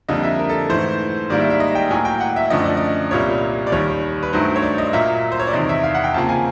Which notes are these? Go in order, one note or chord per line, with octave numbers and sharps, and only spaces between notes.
F2 D3 G3 A#3 D#5
E5
A#4
A4
G#2 E3 A3 C5
G#2 D#3 G3 A#3 D5
E5
E5
D#5
G5
A2 F#3 A#3 G#5
G5
F#5
E5
F#2 D3 F3 A3 D#5
D5
D#5
C2 A#2 G3 A#3 C#5
D5
D#2 D#3 G3 C#5
B4
G2 D#3 F#3 A3 C5
C#5
D5
D#5
A#2 F#3 A#3 E5
C5
C#5
D5
E2 C3 D#3 D#5
E5
F5
F#5
G5
F2 C#3 F3 A#3 A5
G#5